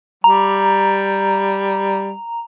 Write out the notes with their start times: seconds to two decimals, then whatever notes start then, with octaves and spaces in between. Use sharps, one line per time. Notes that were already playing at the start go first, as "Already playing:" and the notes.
0.24 G3 A#5